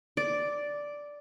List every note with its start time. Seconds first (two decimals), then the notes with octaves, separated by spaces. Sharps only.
0.17 D5